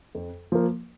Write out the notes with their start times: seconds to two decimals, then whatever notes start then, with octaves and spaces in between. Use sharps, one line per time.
0.15 F2
0.52 F3 A#3